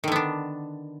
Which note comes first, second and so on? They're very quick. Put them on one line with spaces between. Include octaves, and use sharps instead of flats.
D#3 D3 B3 D4